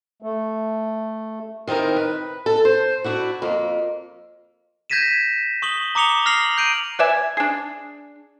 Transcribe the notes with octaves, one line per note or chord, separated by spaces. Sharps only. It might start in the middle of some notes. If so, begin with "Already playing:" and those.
A3
D#3 C4 D#4 E4 A#4
B4
A4
C5
D4 E4 F#4
F2 A#3
G6 G#6 A#6 B6 D#7 E7
C#6 D#6 F#7 G7
A#5 D6 D#6 C#7 F7 G7
F6 A#6 C7 F7 F#7
G6 D7 D#7
B4 D5 E5 G#5
D4 G#4